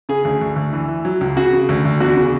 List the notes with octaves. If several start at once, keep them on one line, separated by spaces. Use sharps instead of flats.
C#3 G#4
D2
D2
D2
E3
E3
F#3
C#2
C#3 F#4
C#3
D2
D2
E2 F#4
C#3